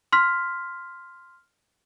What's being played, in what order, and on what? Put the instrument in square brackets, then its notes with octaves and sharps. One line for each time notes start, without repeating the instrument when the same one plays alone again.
[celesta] C6 F6 B6